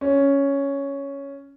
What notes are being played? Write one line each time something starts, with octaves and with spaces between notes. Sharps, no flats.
C#4